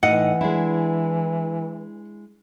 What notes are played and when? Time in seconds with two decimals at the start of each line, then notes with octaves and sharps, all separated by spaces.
0.03 A2 E3 D#4 D#5 F#5
0.41 G#3 D4 E4